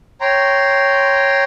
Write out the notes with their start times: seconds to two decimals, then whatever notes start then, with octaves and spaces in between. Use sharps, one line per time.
0.21 C#5 G5 A#5 C6